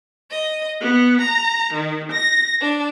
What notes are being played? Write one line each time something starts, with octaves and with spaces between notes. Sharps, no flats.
D#5
B3
A#5
D#3
A#6
D4